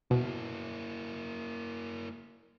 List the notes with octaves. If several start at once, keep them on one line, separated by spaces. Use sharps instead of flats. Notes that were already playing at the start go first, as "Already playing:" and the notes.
B2 A#3 E4